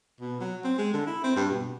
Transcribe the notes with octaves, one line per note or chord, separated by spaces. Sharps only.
B2
F#3
C4
G#3
D3
E4
C4
G2
B2